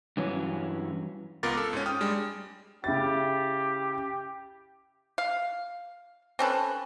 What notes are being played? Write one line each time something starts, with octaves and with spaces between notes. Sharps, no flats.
G2 E3 F#3 C#4
C#2 B3 F4 A#4 D6 A6
A4
G#2 C#4
G5 D#6 F6
G3 G#3 D4
C#3 E4 G4 A6
F5
C4 C#4 A4 B4